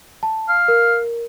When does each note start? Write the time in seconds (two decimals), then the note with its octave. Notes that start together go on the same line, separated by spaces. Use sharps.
0.23 A5
0.48 F5
0.68 A#4